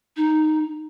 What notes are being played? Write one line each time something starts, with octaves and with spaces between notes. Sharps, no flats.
D#4